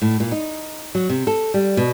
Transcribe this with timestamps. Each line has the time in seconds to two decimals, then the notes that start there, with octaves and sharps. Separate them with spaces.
0.02 A2
0.20 A#2
0.32 D#4
0.95 F#3
1.10 C3
1.27 A4
1.54 G3
1.77 B2